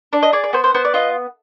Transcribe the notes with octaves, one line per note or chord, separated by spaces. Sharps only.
D4 D5
D#5
G#4 D5
D5
B3 C5
C5
B3 C5
D5
F4 D#5